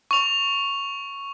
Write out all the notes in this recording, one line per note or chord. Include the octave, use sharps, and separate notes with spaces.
C#6 F7